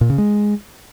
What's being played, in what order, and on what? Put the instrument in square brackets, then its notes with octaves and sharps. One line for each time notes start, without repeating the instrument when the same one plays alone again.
[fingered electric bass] A#2
C#3
G#3